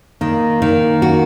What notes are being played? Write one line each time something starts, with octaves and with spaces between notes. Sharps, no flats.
D#3 A#3
D#3
F#4